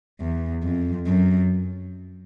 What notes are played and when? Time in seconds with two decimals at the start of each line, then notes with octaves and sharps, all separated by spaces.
0.20 E2
0.63 F2
1.06 F#2